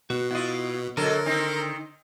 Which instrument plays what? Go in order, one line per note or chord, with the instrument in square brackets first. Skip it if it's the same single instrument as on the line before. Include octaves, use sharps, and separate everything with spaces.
[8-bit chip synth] B2 [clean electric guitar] F#4
[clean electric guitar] B3 D#5 [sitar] E4 F4
[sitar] B2 F#3 A4 [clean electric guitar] D3 [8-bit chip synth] A#4
[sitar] D#3 C4 D#4